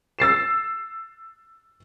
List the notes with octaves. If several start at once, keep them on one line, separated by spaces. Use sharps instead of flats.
E6 A6 C7 E7